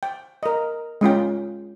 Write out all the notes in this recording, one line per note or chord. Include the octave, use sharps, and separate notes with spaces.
G5
A#4 D#5
G#3 C#4 F4 G5